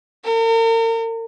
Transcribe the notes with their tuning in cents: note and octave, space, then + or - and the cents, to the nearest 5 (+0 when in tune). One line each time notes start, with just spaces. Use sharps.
A#4 -40